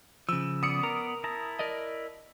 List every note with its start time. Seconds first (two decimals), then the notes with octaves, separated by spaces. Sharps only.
0.29 C#3 F3 E6
0.63 B3 D5 D#6 C#7
0.83 A#4
1.24 E4 A5 A#5
1.59 A#4 D5 D#5